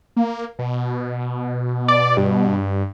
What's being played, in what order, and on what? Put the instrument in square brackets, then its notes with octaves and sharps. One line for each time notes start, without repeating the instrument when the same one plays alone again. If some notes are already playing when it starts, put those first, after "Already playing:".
[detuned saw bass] A#3
B2
[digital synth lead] D5
G2